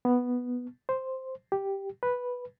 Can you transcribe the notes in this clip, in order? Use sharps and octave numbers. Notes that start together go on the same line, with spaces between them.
B3
C5
G4
B4